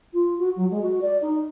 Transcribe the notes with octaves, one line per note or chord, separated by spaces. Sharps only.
F4
F#4
F#3
G#3
F#4
D5
D#4